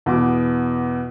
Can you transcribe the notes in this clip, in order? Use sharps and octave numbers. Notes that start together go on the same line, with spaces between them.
E2 B2 D6